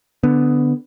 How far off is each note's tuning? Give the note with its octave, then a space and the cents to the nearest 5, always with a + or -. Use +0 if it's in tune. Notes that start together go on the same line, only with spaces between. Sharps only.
D3 +0 B3 +10